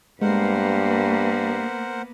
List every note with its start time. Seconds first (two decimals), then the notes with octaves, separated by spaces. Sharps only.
0.22 G2 G#3 A#3 B3 A#4 C5 F#5 C7